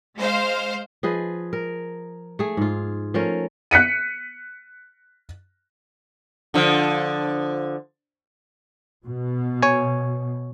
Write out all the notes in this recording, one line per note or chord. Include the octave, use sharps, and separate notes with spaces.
G#3 C5 F5
F3 G#4 B4 D#5
A#4
A3 G#4
G#2 F4
F3 A3 C#4 A#4
F#6 B6 C#7 D#7
D3 F3
B2
C#5 G#5